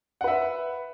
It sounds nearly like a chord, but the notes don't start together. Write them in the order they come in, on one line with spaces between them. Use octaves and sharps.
F#5 B4 E5